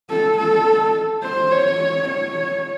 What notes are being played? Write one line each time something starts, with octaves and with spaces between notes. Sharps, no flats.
A4
A4
C5
C#5
C#5